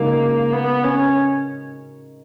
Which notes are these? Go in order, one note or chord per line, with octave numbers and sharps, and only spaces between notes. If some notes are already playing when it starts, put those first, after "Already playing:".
Already playing: C#3 G#3 A#3 D#4 F#4 A#4
B3
C#4